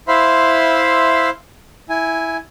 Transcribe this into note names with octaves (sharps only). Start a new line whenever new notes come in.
E4 C5 E5 F5 B5 C6
E4 G#5